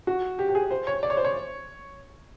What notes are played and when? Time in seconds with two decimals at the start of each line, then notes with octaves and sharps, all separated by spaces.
0.07 F#4
0.39 G4
0.49 G4
0.55 G#4
0.71 C5
0.87 C#5
1.03 D5
1.10 C#5
1.17 C5
1.25 C#5